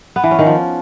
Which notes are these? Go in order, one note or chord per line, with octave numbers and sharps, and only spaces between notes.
B3
E3
C#4
D#3
F3